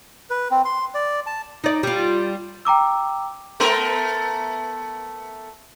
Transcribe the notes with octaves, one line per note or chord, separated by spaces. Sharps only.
B4
C4
C6
D5
A5
D#4 D5
G3 F4
G5 A#5 D6 E6
A3 B3 A#4